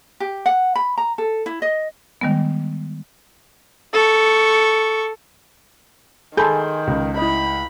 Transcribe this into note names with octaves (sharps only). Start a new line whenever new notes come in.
G4
F#5
B5
A#5
A4
E4
D#5
D#3 G3 G#3 B3
A4 C#6
D#3 G#4 A4 G#5 B5 C6 G6
C#2
E4 D#5 B5